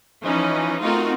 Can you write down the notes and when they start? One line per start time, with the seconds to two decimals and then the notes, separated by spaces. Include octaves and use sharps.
0.23 E3 F3 C#4 D#4
0.81 A3 C4 D#4 F4 F#4 A#4